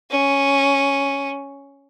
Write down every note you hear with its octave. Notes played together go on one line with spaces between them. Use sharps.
C#4